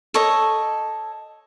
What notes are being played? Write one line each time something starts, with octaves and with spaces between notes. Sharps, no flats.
A4 C#5 D#5